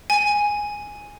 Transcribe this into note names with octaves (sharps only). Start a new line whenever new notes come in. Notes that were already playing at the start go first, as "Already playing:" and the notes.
G#5